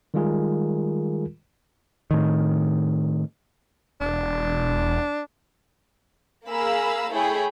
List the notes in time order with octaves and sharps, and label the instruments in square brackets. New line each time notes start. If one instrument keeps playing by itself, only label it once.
[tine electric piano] D#3 G3 G#3 F4 G#4 A#4
[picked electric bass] A2 D#3
[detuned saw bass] E1 [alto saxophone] D4
[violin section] A#3 G#4 F5 A#5 B5 E6
A3 E4 G#4 C#5 G5 B5